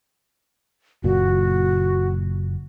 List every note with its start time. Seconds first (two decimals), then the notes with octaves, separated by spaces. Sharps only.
1.04 F#1 A#2 F#4